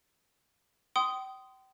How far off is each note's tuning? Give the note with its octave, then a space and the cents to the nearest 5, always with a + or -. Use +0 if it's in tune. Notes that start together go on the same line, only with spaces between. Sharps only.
G5 -35 C6 -20 D#6 +0